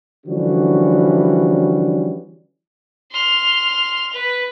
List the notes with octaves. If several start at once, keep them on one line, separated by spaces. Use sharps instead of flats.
D3 E3 F3 G3 C#4 F#4
C6 F6
B4